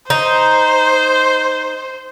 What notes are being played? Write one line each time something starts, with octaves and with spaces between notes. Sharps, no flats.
D#4 C5